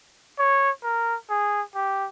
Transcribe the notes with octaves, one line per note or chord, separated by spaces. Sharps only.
C#5
A#4
G#4
G4